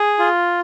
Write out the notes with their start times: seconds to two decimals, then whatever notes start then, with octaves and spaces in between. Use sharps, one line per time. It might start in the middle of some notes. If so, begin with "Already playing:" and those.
Already playing: G#4
0.19 F4